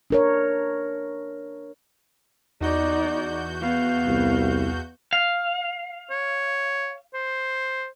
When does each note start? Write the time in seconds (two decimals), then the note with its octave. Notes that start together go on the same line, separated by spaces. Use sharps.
0.10 D4 A#4 C#5
2.61 E2 D#4 F#4 D5 G6
3.62 B3 F5
4.07 C2
5.13 F5
6.10 C#5
7.14 C5